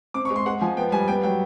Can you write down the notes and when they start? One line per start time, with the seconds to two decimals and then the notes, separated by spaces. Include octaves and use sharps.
0.14 C4 D6
0.25 C#6
0.30 G#3
0.36 C6
0.46 G#3 F#5
0.61 F3 G#5
0.77 B3 G5
0.92 G3 G#5
1.08 B3 G5
1.23 F#3 G5